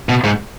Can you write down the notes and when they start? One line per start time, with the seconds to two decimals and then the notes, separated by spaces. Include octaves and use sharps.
0.09 B2
0.24 G#2